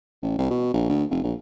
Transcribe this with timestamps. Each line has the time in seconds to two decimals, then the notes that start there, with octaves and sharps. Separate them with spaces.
0.23 A1
0.38 C2
0.51 B2
0.74 A#1
0.90 D2
1.11 F1
1.23 A#1